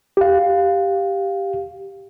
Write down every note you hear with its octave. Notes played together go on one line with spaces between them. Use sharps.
G4 F5